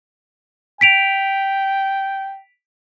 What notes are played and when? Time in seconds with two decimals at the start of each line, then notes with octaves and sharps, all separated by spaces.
0.81 G5 B6 D7 F7